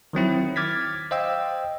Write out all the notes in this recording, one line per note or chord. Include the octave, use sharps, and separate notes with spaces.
D#3 F#3 C4 E4
D6 F6 G#6 A6 B6
C5 D#5 F5 G5 E6